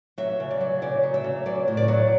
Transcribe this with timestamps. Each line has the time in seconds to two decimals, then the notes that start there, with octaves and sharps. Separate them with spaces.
0.18 F#3 E5
0.40 C#3
0.51 D5
0.61 F#3
0.82 C#3 D5
1.03 F#3
1.14 E5
1.24 C#3
1.46 F#3 D5
1.68 A2
1.77 D5
1.88 F#3